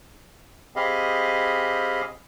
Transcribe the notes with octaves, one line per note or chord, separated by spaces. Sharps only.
C4 G4 G#4 D#5 F5 B5